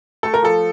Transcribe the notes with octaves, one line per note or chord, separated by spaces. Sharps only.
A3 A4
A#4
F3 A4